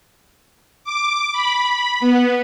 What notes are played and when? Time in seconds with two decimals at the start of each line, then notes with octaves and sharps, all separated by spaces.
0.84 D6
1.33 B5
2.00 B3